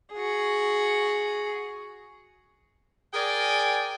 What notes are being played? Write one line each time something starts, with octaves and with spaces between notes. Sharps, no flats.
F#4 G#4
G#4 A#4 D5 G5 G#5